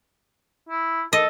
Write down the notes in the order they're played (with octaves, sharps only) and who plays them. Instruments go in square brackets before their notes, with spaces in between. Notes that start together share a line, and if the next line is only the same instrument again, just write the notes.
[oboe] E4
[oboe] A4 [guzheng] D#5